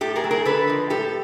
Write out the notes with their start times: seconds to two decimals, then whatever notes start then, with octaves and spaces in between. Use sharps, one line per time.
0.01 A2 G4 A4
0.16 G#4 A#4
0.24 F#3 A3
0.31 G#4 A#4
0.45 D3 A4 B4
0.68 F3 G#3
0.90 A2 G4 A4